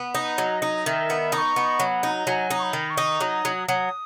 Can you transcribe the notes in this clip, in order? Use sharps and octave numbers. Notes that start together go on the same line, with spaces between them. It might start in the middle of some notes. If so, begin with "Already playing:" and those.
Already playing: B3 B4
D#4
F#3 D#5
D#4
D#3 E5
B3
D#4 D#6
C#6
B3
F#3
D#4
F#3 G#5
D#4
C#6
B5
D#3
C#6
D#4
F#3 D#6
F#3
F#3 D#6